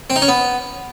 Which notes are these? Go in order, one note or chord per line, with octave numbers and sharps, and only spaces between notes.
C4
D#4
C#4
B3